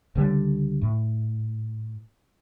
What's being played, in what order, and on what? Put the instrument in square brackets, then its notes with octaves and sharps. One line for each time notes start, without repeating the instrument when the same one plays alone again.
[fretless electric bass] C#2 D3 G3
A2